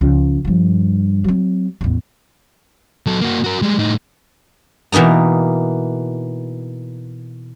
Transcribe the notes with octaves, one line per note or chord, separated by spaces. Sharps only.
C#2 F3
G2 F3
F#3 C4
A1 E2
F#3 A4
A#3 F#4
F#4 A#4
G3 G#3
A2 D#4
B2 E3 A#3 D#4 A#5